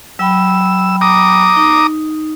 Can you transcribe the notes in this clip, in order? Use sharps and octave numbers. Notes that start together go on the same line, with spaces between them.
F#3 G5 B5 E6
A#5 D6 D#6
D#4